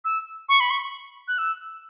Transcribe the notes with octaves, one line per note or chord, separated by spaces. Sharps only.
E6
C#6
B5
C#6
F#6
E6